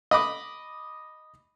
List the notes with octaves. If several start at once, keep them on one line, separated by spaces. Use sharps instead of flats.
D#5 B5 D6